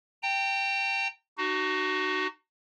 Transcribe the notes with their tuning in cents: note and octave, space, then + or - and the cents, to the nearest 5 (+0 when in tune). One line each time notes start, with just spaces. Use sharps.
G5 +0 A#5 -40
D#4 -40 F#4 +15